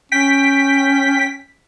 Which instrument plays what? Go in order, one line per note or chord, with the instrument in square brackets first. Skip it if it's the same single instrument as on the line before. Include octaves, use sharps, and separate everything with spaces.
[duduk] C#4 [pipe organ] G5 [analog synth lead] B6